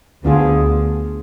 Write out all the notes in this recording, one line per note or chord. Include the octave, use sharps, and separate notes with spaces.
D2 D3 B3 D4 F4 G#4